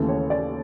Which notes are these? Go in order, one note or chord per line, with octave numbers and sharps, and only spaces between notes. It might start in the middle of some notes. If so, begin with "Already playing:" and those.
Already playing: D#2 C#3 E3 A3 A4
C#5
D5